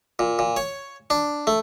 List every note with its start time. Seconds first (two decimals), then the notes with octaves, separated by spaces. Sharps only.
0.19 A#2
0.39 A#2
0.56 C#5
1.10 D4
1.47 A3